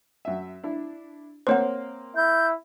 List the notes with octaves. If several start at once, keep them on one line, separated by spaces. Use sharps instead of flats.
F#2 E5
D4 E4
A#3 C4 C5 C#5 F#5 C6
E4 G6